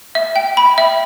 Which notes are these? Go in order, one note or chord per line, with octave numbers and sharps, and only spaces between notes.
E5
G5
B5
E5